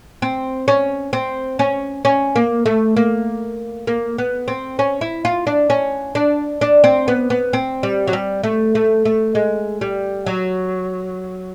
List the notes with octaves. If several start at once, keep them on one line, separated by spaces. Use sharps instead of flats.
C4
C#4
C4
C#4
C#4
A#3
A3
A#3
A#3
B3
C4
C#4
E4
F4
D4
C#4
D4
D4
C4
B3
B3
C4
G3
F#3
G3
A3
A3
A3
G#3
G3
F#3